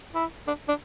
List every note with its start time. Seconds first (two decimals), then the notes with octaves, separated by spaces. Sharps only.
0.15 E4
0.47 D4
0.68 D4